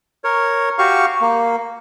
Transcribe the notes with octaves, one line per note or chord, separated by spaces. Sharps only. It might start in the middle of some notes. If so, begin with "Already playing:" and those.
A#4 C#5
F#4 G4 F5 C#6
A#3